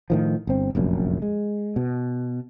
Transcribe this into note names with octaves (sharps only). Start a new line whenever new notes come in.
A2 D#3 F3
G1 C4
F1 A#1 F#2
G#3
B2